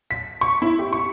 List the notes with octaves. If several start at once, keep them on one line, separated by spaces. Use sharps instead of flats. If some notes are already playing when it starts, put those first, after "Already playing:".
B6
C#6
E4
G4
C#6